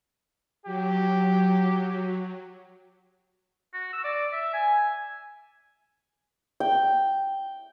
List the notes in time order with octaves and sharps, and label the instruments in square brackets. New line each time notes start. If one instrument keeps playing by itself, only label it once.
[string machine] F#3 [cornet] G4
[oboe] F#4
E6
D5
E5
G#5
[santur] G5